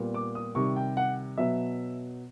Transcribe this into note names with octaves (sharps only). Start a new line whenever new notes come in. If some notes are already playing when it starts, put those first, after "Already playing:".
Already playing: A#2 G3 B3
D6
D#6
C3 D#3 G3 C#6
G5
F#5
B2 F#3 B3 E5